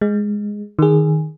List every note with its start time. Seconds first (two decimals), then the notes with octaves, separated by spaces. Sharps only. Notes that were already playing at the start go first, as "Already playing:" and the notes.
0.01 G#3
0.79 D#3 G#4